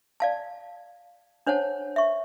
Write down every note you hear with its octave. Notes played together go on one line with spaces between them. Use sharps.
D5 F5 A5
D4 C5 C#5 F#5 A5
E5 C#6